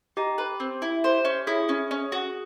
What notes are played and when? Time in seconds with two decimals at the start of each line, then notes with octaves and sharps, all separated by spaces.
0.17 D#4 G4
0.38 B4
0.60 C4
0.82 E4
1.04 C5
1.25 C#4
1.47 E4 G#4
1.69 C#4
1.91 C#4
2.12 F#4